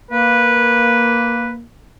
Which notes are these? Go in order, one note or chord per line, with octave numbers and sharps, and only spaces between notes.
A#3 B4